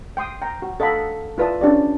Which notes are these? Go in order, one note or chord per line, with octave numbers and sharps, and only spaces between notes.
G5 C6 D#6
G5 A#5
F#4
A4 D#5 F5 F#5 B5
E4 F4 B4 D5 A5 D#6
C#4 D4 G4 D5